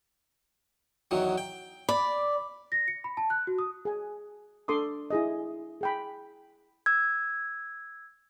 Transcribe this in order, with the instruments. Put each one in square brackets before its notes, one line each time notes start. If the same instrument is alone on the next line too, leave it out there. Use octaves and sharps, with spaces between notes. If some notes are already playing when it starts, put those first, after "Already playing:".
[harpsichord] E2 D#3 F#3
G5
[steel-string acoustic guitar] D5 [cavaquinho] B5
[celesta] A#6
C#7
B5
A5
F#6
F#4
D#6
[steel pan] G#4 G#5
D4 A4 C6 D6 D#6
E4 G#4 D#5
G#4 G5 B5
[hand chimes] E6 G#6